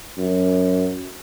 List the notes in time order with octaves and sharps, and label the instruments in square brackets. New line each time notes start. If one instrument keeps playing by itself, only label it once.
[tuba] F#2